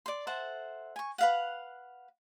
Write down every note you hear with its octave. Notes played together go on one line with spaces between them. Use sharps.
D5 C6
A4 C5 E5 F#5
G#5 C#6
B4 F5 F#5